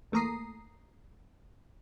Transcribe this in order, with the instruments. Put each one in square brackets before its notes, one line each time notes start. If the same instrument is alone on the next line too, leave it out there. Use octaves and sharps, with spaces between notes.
[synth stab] E2 A3 A#3 A#5 D#6 C7